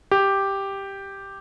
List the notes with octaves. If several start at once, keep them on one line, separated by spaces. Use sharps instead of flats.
G4